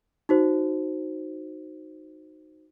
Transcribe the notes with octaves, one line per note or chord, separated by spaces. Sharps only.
D#4 F#4 C5